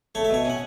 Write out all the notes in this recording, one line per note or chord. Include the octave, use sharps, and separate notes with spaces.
A3 C#5
E5
B2 C#5
C#4 F#5